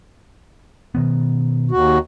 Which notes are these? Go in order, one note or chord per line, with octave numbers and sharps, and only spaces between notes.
B2 D#3 B3
D#2 F#4